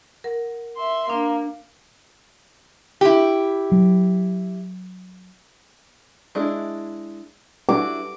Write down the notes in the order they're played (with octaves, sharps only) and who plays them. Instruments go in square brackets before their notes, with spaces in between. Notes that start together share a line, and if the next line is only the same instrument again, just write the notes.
[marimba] A#4 F#5
[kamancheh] E5 C6
[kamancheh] A#3 [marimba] D4
[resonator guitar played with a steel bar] E4 G4
[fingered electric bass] F#3
[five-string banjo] G#3 D4 E4
[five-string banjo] D4 E4 F#4 [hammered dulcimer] D6